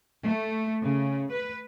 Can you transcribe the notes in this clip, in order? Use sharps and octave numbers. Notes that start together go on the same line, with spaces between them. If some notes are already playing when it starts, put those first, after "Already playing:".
A3
C#3
B4